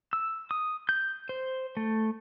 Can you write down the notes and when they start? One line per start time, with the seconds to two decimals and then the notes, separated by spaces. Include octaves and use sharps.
0.13 E6
0.51 D#6
0.89 G6
1.29 C5
1.77 A3